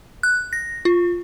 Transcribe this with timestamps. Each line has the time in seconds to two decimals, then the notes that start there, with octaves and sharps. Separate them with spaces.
0.23 F#6
0.53 A#6
0.85 F4